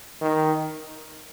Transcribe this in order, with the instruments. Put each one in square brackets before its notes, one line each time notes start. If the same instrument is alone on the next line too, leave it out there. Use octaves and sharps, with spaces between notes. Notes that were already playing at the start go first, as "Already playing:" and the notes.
[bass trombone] D#3